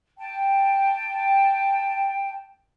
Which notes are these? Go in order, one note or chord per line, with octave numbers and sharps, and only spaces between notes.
G5 A5